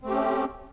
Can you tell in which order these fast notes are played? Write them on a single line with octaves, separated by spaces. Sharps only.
C4 A3 G4 C#4